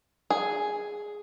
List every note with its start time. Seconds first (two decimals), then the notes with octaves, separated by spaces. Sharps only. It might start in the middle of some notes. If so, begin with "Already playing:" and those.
0.30 G#4